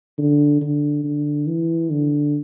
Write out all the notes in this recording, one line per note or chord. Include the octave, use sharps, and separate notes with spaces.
D3
D3
D3
E3
D3